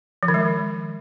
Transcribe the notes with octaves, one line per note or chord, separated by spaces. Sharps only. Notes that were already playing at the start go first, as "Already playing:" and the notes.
F3
D#3
G#3